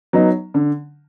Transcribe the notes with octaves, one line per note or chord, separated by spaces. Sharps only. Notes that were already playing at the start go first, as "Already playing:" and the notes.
F#3 B3 D#4
D3